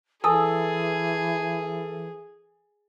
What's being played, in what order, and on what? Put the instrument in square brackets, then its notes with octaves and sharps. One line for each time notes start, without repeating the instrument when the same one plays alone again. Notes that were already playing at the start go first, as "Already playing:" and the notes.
[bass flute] E3 [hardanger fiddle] G#4 [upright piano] A4 [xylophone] G#5 D#6 E6